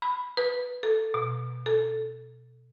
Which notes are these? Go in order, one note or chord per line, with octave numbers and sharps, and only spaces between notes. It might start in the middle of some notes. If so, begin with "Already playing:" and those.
B5
B4
A4
B2
A4